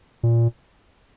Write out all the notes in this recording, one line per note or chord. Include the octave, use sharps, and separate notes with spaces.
A#2